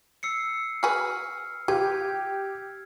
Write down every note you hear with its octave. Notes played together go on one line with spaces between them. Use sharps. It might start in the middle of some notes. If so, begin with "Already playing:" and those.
E6 C7 C#7
F#4 G#4 B4 F6
F4 G4 G#6